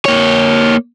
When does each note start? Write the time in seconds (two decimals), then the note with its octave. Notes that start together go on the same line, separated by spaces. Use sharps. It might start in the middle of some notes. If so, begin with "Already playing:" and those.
0.05 A#3 C#5